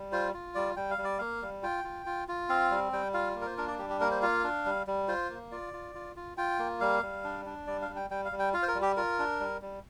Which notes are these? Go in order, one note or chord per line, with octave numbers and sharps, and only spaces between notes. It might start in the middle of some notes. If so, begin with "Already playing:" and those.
Already playing: G3
F4 C5
F4
G3 D5
G3 G5
F5
G3
D5
A#3 F5
G3
F4 G5
F4
F4
F4
C4 F5
G3
G3 G5
F4 F5
A#3
A#4
C5
D4 A#4
D5
G3 G4
G4
A#3 A#4
C5
F4 F5
D4
G3
G3
F4 C5
A#3
F4 D5
F4
F4
F4
F4 G5
A#3
G3 F5
G3
D4
D4
G3 D5
F5
G3
G5
G3 G5
F5
G3
G5
F4 F5
C5
A#4
G3
G4
F4 A#4
D4
G3
G3